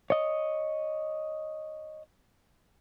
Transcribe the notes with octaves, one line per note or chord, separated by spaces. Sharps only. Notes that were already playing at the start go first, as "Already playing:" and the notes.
C#5 D#5